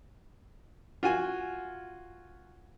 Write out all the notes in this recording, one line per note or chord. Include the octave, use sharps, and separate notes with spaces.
F4 F#4 G#5